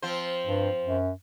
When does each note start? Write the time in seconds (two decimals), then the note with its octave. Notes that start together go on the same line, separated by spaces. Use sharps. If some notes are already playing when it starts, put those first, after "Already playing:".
0.02 F3 C4 C5
0.46 G2
0.82 F#2